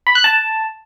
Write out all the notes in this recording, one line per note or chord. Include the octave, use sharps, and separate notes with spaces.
B5
F#6
A5